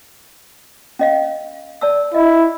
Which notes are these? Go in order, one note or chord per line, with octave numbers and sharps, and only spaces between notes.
C#4 D#5 F5
D5 A5 E6
E4 D#5